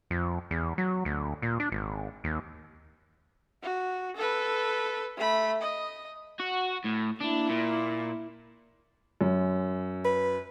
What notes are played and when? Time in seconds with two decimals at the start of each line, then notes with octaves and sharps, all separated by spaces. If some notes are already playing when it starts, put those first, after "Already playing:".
0.11 F2
0.51 E2
0.78 F#3
1.05 D2
1.42 A#2
1.60 D4
1.72 G#1
2.24 D#2
3.63 F#4
4.16 A4 B4
5.17 A3 B5
5.61 D#5
6.40 F#4
6.85 A2
7.21 A#3 D4 E4
7.50 A#2
9.21 F#2
10.05 B4